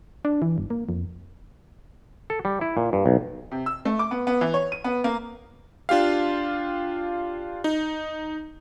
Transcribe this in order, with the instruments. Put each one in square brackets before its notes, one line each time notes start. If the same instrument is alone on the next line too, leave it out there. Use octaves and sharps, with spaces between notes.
[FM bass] D4
E3
G1
A#3
F2
[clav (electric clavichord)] A4
G3
E4
A#2
G2
B1
[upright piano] C3
E6
A3
D6
B3
B3
E3
C#5
D#7
B3
A#3
[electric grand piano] D4 F4 G4 F5
D#4